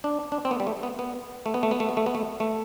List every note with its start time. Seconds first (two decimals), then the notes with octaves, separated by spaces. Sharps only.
0.04 D4
0.32 D4
0.45 C4
0.51 B3
0.60 G3
0.67 A3
0.83 B3
0.99 B3
1.46 A3
1.54 B3
1.63 A3
1.71 B3
1.80 A3
1.89 B3
1.97 A3
2.06 B3
2.15 A3
2.40 A3